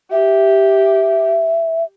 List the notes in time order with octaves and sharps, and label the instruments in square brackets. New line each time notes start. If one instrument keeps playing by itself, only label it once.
[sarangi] G4 [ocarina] E5